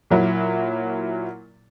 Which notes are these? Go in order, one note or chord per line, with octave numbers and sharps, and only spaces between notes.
A#2 F#3 E4